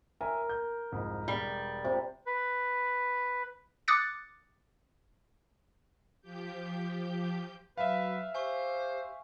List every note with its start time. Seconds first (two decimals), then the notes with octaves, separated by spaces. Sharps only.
0.21 A#4 C#5 E5 G#5
0.49 G6
0.92 C2 F2 G#2
1.28 E1 G3 D5
1.84 C3
2.26 B4
3.88 D6 D#6 F#6 A6 C#7
6.22 F3 G4 G6
7.77 F#3 B4 E5 F5
8.35 G4 C5 G#5 C#6